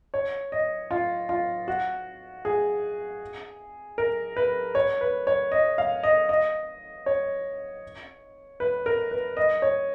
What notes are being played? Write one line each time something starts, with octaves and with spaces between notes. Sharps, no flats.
C#5
D#5
F4
F4
F#4
G#4
A#4
B4
C#5
B4
C#5
D#5
F5
D#5
D#5
C#5
B4
A#4
B4
D#5
C#5